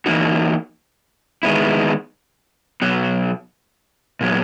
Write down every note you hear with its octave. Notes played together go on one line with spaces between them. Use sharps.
E3 A#3 D#4 F#4
D#3 G#3 B3 E4
B2 F#3 B3 F#4
A#2 F#3 B3